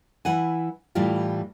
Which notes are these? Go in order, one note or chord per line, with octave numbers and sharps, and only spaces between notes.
E3 E4 F#5 G#5
A2 E3 G3 F4 G4